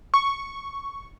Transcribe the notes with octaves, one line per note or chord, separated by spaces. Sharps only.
C#6